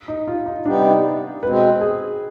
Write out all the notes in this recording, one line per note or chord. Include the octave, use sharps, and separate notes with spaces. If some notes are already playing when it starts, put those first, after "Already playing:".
D#4
F4
D#4
C3 G3 B3 D4 D#4 G4
B2 G#3 C4 B4
G#4